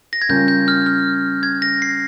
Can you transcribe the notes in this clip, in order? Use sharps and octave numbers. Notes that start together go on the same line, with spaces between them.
A#6
G#6
C#3 G3 C#4 F4 A#4 G6
G6
F6
F6
G#6
A#6
C7